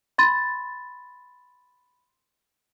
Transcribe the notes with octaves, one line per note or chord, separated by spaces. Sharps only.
B5 C6 A6